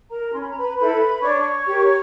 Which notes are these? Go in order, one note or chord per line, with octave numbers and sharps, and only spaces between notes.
A#4 A#5
C#4 C6
B5
A#5
B4 B5
E4 A4 B4 C5 B5
D4 C#5 C#6
G4 A#4